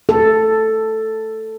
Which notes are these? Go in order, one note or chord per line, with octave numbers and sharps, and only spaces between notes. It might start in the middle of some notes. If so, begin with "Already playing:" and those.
A4